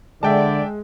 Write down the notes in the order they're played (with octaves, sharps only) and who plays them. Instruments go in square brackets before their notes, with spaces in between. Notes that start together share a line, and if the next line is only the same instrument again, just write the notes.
[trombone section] D3 [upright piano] G#3 [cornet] D5 [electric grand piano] E5 G5 A5